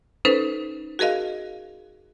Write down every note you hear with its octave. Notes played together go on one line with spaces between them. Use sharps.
C#4 D#4 A4 B4 C5
F#4 G#4 A#4 D#5 F5